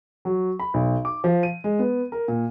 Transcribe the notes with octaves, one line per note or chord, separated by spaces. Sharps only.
F#3
B5
B1
D6
F3
D#7
G#3
B3
A#4
A#2